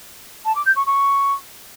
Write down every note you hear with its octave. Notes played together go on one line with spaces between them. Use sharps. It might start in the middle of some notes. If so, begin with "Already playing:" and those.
A5
D6
G6
C#6
C#6